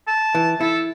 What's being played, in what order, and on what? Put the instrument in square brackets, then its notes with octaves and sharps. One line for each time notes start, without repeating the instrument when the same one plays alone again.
[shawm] A5
[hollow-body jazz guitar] E3
[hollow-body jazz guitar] E4 [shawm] A4